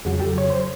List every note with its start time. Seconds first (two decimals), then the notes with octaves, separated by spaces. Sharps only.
0.05 F2 C#3 F#3 F#4 G#4
0.20 G4 A4
0.38 C#5
0.50 C5